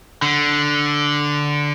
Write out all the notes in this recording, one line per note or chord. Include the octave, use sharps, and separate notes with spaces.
D3